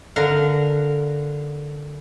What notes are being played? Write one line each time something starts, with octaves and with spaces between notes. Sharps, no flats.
D3 A#4 F5 F#5